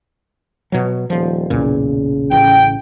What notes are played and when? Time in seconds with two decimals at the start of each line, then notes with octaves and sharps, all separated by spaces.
0.72 B2 F#3
1.10 D#1 F3
1.50 B1 E2 A#2 C#3
2.31 A1 G5